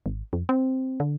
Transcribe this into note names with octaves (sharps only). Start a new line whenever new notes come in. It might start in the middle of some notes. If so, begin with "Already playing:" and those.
G#1
F2
C4
D3